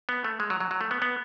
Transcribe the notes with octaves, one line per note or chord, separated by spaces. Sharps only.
B3
A3
G#3
F#3
F#3
F#3
A3
B3
B3